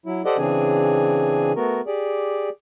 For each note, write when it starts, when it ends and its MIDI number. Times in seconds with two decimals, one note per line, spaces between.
0.06 0.22 54
0.06 0.22 64
0.25 0.37 67
0.25 0.37 69
0.25 0.37 72
0.25 0.37 74
0.25 0.37 75
0.25 0.37 78
0.38 1.52 49
0.38 1.52 52
0.38 1.52 60
0.38 1.52 62
0.38 1.52 68
0.38 1.52 80
1.56 1.81 57
1.56 1.81 59
1.56 1.81 66
1.56 1.81 70
1.87 2.49 67
1.87 2.49 68
1.87 2.49 74